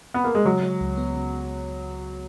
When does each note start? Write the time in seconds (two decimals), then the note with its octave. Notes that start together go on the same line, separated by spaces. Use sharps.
0.14 B3
0.24 A#3
0.35 G#3
0.45 C#3 F#3
0.63 G#3
0.81 C#2
0.97 B3
1.15 C#3